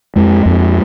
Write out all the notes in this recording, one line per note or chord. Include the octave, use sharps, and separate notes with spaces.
F2 G#3
F2